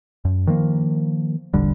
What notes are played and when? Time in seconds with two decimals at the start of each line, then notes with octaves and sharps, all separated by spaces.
0.25 F#2
0.47 D#3 F3 A#3
1.54 E1 A#1 D3 G3